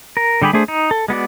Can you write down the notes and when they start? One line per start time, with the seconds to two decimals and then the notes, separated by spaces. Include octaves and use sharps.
0.17 A#4
0.42 D3 G3 G4 G#4 B5
0.53 A3 D4 G#4 C5
0.68 D#4
0.91 A4
1.08 G#3 B3 F#4 D5